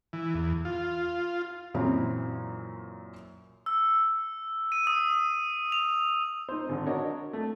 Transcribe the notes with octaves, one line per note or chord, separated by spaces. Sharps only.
E3
E2
F4
F#2 A#2 E3 C4 E4
E6
D#7
D#6
F7
D#4 C5
G#1 D3
D4 F#4 A#4 C#5 D#5
A3